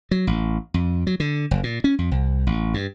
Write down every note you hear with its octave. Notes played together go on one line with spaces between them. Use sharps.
F#3
A1
F2
F#3
D3
F#1
A#2
C#4
F2
C2
A1
G2